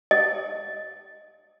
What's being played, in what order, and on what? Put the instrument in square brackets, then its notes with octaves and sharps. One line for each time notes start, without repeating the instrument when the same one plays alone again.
[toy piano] D#5